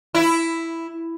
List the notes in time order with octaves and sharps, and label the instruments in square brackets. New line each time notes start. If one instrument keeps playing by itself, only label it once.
[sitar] E4